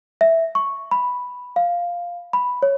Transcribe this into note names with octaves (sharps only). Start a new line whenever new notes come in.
E5
C#6
B5
F5
B5
C#5